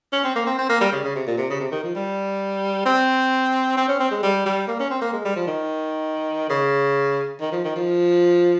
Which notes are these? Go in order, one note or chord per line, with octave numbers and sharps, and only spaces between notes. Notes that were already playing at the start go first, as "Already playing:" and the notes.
C#4
C4
A#3
C4
C4
A#3
G3
C#3
C#3
C3
A#2
C3
C#3
C3
D#3
F3
G3
C4
C4
C#4
C4
G#3
G3
G3
A#3
C#4
C4
A#3
G#3
G3
F3
D#3
C#3
D#3
F3
D#3
F3